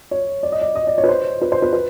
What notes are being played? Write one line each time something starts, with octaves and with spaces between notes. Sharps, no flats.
C#5
D5
D#5
D5
D#5
D5
C#5
B4
C5
B4
C5
B4
B4